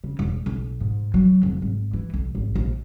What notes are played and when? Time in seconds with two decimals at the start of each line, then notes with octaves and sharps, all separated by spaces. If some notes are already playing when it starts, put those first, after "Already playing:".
0.04 C#3
0.19 E1
0.46 B1
0.81 G#2
1.14 F#3
1.43 F1
1.62 G#1
1.93 E3
2.14 B1
2.35 G#1
2.56 A#1